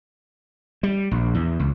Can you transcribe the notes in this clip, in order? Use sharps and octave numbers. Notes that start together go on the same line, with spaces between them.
G3
A#1
E2
C#2